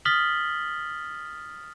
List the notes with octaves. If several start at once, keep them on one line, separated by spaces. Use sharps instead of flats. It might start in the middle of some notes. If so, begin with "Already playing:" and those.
D#6 F6 A6 B6 F#7 G7